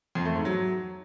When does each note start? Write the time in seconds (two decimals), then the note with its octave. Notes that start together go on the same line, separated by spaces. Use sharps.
0.15 F2
0.25 A3
0.35 G#2
0.45 F#3